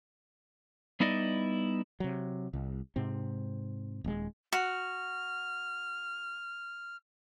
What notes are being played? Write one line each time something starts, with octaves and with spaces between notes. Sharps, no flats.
G3 B3 D#4 E4 D5 D#5
C3 F#3
C2
G#2 C3 C4
D#1 G#3
F#4 F6